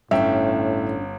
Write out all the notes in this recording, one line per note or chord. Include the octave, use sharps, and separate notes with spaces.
G1 A2 C#4 D4 E5 G5